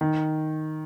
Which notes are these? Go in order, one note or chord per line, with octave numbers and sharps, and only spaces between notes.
D#3